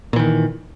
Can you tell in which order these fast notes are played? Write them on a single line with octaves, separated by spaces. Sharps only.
A#2 E3 D#3